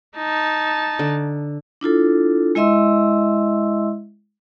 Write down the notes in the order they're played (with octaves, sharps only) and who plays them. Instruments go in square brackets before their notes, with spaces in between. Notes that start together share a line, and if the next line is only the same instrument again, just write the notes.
[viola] D#4 A5
[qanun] D3
[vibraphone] D4 E4 F4 A4
G#3 E4 D#5 E5 C6 E6